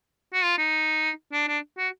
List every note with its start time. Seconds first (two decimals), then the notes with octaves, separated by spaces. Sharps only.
0.33 F#4
0.43 F4
0.58 D#4
1.33 D4
1.48 D4
1.78 F#4